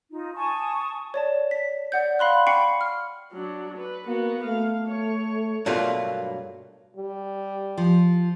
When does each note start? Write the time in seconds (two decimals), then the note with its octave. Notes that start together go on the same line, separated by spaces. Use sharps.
0.11 D#4 F4
0.35 G#5 A5 C#6 D#6
1.14 C#5 D5 A5
1.51 B6
1.92 D5 F#5 G6
2.19 F5 B5 C6 F#6
2.47 G5 B5 C#6 C7 C#7
2.81 F6
3.33 F#3 D4
3.78 B4
4.07 A#3 B3 F#4
4.44 A3 F5
4.88 C#5
5.66 G2 B2 F#3 A3 A#3 F4
6.97 G3
7.77 F3